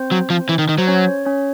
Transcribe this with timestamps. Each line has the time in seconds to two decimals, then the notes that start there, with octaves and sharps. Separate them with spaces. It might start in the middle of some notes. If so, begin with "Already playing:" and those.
Already playing: C4 C5
0.11 F#3
0.30 F3
0.49 E3
0.59 D#3
0.69 D#3
0.78 F#3 C5
0.87 C#4 C#5
1.25 C#4 C#5